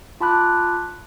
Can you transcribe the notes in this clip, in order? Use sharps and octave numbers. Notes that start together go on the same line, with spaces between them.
F4 A5 B5 D6 F#6